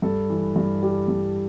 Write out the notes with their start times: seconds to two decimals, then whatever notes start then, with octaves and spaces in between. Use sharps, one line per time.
0.02 G2 A4
0.30 E3
0.56 G2
0.83 G3 G4
1.08 G2